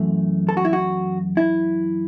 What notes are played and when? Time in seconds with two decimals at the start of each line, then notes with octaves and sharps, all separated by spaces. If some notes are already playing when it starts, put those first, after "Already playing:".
Already playing: F#2 E3 A3
0.49 A4
0.57 F#4
0.65 E4
0.73 F#4
1.37 E4